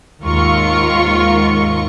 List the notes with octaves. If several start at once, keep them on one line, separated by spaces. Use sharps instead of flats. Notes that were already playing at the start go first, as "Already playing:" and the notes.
D#2 G#2 F4 A#4 C#6